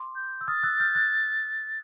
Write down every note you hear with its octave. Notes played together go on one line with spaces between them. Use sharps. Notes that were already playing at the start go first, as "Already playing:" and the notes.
Already playing: C6 D6
G6
E6
D#6 F6 A6
E6 F#6
F6 G6
F#6 G#6